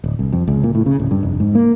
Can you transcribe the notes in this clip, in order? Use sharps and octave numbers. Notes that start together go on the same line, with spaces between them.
D1
C2
F2
C#2
A#2
A2
C#3
D1
G2
F1
G#2
A#3